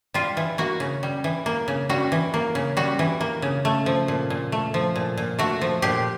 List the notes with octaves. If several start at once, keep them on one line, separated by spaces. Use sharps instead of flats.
G3 F4
E3
A#3 F#4
C#3
G3
E3
A#3
C#3
G3 F#4
E3
A#3
C#3
G3 F#4
E3
A#3
C#3
A3
F3
A#2
A#2
A3
F3
A#2
A#2
A3 F#4
F3
A#2 G4